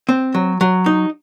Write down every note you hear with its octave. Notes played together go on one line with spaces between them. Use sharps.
C4
F#3
F#3
D#4